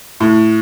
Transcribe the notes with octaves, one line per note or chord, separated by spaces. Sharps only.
A2